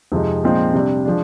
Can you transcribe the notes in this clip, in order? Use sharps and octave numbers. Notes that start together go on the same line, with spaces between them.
F2 C3 F3 G#3 D#4
A#2 F3 G#3 C4 D#4
C3 G3 D4
F3 G#3 D4